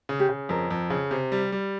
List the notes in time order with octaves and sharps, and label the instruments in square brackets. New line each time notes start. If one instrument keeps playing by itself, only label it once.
[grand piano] C#3
[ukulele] G4
[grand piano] C#3
[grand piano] F2 [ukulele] A#4
[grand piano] F2
C#3
C3
G3
G3